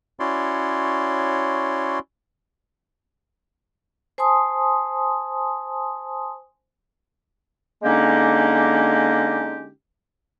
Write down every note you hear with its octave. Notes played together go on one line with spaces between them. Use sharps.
C#4 E4 F#4 C#5 D5 C6
C5 G#5 A5 C6 D#6
D3 G#3 A#3 C#4 D#4 G4